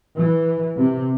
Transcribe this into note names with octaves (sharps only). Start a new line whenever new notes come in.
E3
C3